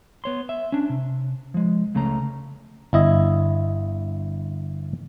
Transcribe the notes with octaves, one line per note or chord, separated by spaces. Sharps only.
B3 C#5 C6
E5
C#4 D4
C3
F3 G#3
C#2 C#3 A3 C#4 A#5
G1 E4 D#5